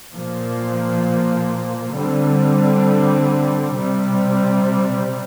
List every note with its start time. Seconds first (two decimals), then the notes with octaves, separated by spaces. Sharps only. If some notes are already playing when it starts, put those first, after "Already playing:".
0.14 A#2 F3 A#3
1.95 D3 G3 C4
3.78 C3 G3 C4